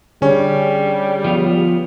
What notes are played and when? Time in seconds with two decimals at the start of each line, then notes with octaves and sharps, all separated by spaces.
0.22 D3 G3 C#4 G#4 C#5
1.24 F3 B3 F4